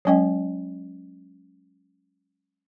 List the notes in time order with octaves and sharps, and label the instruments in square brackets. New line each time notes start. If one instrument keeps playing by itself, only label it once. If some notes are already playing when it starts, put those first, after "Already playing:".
[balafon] F#3 G#3 C#4 D#5 G5